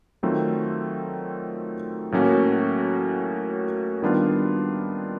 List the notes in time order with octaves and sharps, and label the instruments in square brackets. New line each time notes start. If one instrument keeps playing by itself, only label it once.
[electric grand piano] D#3 F#3 A3 C4 F4
A2 F#3 A#3 C#4 F#4
D#3 G3 B3 D4 F4